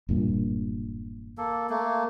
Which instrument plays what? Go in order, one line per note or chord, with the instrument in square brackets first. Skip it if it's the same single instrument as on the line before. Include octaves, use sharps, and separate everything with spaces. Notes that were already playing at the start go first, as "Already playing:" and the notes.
[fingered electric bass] E1 G2 A#2
[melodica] A#3 A4
A3 A#3